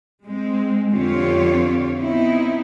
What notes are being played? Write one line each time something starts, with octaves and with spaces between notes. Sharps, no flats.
G#3 C4
F2 D3 C4 F4 G4 C#5
B3 C4 D#4 E4